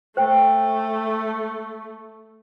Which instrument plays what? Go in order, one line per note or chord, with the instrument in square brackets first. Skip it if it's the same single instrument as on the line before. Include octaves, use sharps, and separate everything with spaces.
[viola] A3 [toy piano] C5 G5